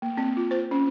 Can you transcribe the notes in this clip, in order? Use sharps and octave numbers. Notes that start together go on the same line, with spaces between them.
A#3
C4
F4
C5
C#4